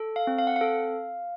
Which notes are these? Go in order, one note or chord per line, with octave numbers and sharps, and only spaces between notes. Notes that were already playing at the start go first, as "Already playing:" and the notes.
Already playing: A4
F5
C4
F5
F#5
F5
A4